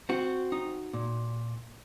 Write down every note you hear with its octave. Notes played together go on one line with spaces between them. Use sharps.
C4 F#4
D#4
A#2